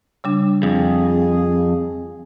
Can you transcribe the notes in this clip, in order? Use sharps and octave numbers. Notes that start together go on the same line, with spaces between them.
C#3 G3 D4
F2 G#4